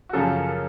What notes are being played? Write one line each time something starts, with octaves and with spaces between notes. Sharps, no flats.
F#4
F#2 C#3 F3 A4
A#4